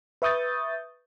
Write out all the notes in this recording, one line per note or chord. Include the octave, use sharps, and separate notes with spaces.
B4 E5 C#6 D#6 G6 A6